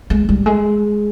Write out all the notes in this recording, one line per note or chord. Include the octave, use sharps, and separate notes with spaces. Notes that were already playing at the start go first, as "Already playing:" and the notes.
G#3
G3
G#3